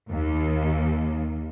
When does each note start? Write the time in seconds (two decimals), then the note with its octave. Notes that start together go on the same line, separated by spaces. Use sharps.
0.10 D#2